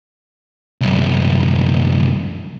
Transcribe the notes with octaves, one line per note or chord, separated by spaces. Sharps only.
C2 F#2